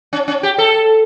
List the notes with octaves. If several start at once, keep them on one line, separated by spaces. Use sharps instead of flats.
C#4
C#4
G4
A4